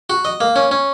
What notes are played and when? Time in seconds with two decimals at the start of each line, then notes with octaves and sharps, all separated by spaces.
0.10 F#4
0.25 D#5
0.41 A#3
0.56 C#4
0.71 C#4